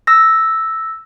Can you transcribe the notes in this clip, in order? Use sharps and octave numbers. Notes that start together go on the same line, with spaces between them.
E6 A#6